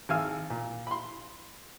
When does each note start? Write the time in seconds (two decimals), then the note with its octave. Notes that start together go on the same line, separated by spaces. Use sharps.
0.09 G#1 F5 G#5 E6 F6
0.50 A#2
0.87 B5 C6